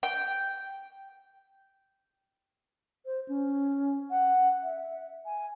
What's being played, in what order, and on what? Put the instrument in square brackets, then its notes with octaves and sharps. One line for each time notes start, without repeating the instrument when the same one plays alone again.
[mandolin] G5
[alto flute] C5
C#4
F#5
E5
G#5